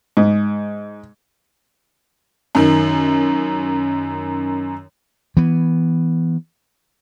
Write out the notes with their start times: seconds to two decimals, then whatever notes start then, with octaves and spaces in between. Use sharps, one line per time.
0.17 G#2
2.55 F#2 D#3
5.37 E3 B3